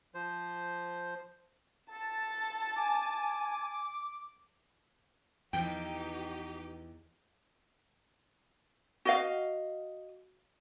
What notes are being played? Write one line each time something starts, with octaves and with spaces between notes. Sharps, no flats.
F3 C5
A4 A5
G#5 D6
E2 E3 F3 D#4 G4 G5
F#4 D#5 F5